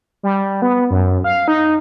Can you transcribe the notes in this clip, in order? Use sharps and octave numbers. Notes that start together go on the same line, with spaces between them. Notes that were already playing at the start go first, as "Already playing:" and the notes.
G3
B3
F#2
F5
D#4